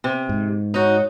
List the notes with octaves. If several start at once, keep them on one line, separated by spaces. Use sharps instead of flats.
C3
G#2
D#4 F#4 C#5